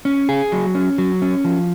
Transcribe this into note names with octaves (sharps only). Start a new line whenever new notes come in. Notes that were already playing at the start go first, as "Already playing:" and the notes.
C#4
G#4
F#3
C#4
F#3
C#4
F3